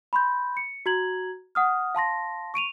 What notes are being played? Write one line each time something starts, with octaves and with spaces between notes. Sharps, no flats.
B5 C6 G6
C#7
F#4 A#5 G#6 F#7
F#5 D#6 F6
F5 A5 C6 A#6
C#6 D7 D#7 F7